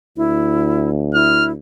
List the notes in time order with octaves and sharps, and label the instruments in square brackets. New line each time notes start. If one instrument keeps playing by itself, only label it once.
[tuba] D2 [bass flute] E4
[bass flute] E4 [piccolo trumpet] F6